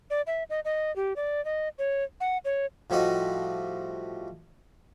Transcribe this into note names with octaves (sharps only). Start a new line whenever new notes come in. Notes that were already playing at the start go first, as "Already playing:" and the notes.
D5
E5
D#5
D#5
G4
D5
D#5
C#5
F#5
C#5
A2 F3 G3 F#4 D#5